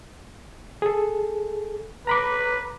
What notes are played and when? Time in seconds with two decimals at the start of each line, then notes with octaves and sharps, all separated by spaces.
0.82 G#4 A4
2.07 B4 A#5 B5 D6